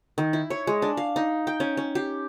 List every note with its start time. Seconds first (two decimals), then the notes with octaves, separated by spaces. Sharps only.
0.18 D#3
0.33 E4
0.50 C#5
0.67 G#3
0.82 D4
0.97 F5
1.16 D#4
1.47 G5
1.60 C#4
1.77 C#4
1.95 G4